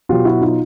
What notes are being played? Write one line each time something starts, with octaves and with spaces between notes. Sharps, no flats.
B2 F#3 F4 G4
E4 F#4
D#4 F4